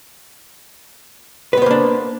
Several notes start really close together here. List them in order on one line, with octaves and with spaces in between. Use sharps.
B4 B3 C5 A#3 D4